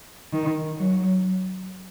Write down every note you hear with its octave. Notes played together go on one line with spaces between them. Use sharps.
D#3
F#3